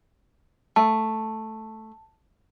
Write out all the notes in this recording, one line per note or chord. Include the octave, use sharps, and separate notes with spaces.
A3 A5